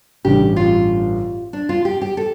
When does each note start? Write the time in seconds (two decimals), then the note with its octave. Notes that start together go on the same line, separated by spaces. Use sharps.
0.24 A1 G2 D3 G3 G4
0.56 F4
1.53 D4
1.69 F4
1.85 G4
2.02 G4
2.17 A4